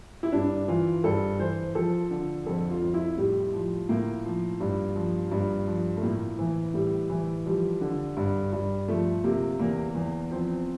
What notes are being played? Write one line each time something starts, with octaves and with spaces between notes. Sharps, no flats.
E4
G2 D4
E3 F4
G2 A4
E3 C5
F3 A4
D3
F2 A4
F4
F2
E4
A2 G3
F3
A2 A#3
F3
G2
F3
G2
F3
A3
A2 A#3
E3
A2 G3
E3
F3 G3
D3
G2
G2
F3 A3
C3 A#3
E2 A#3
E2
F3 C4